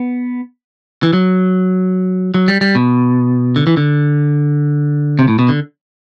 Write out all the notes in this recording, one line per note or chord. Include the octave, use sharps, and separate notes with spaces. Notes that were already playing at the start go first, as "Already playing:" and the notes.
Already playing: B3
E3
F#3
F#3
G3
G3
B2
D3
E3
D3
C3
A2
B2
D3